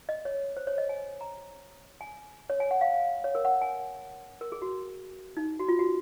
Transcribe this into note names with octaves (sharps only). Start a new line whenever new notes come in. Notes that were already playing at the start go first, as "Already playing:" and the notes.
D#5
C#5
C5
C#5
D#5
G#5
A#5
G#5
C#5
G#5
F#5
F5
C#5
A#4
F#5
G#5
A#4
G#4
F#4
D#4
F#4
F4
F#4